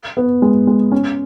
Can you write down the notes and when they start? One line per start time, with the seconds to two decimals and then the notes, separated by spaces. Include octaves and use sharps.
0.17 B3
0.42 G#3
0.67 G#3
0.92 C#4